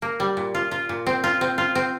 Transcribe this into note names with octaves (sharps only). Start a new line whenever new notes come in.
A#3
G3
A#2
F4
F4
A#2
C4
F4
C4
F4
C4